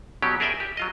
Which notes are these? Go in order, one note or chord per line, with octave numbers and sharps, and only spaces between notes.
B2 F#3 C#4 G4
G#4 A#4 D5 E5 G5 G#5
G4
F#3 F4 D#5